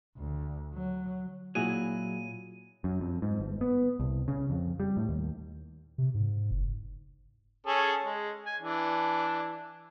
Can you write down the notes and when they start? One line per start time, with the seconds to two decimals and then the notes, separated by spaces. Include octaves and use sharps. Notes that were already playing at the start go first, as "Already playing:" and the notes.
0.17 D2
0.74 F#3
1.55 A#2 F#3 E4 G#4 D#7
2.84 F#2
3.01 F2
3.22 G#2
3.40 G1
3.61 B3
4.00 C2
4.28 C#3
4.50 F2
4.80 G3
4.97 A2
5.09 D#2
5.98 C3
6.14 G#2
6.51 F#1
7.66 C#4 G#4 A4
8.04 G#3
8.46 G#5
8.60 E3 D4